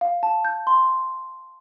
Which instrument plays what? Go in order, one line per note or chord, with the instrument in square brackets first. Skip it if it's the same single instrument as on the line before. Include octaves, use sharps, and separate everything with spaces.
[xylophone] F5
A5
G6
C6